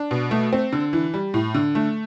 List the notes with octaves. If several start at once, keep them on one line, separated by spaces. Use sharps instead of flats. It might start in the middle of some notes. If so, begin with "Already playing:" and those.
Already playing: D4
B2
A3
C4
D3
E3
G3
A2
D3
A3